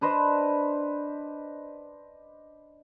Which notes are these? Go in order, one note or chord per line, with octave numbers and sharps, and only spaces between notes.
D4 B4 C5 D#5